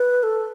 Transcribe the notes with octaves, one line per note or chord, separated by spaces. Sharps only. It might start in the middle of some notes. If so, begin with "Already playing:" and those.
Already playing: B4
A4